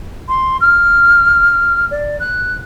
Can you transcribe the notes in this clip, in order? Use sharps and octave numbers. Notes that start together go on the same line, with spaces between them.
C6
F6
D5
F#6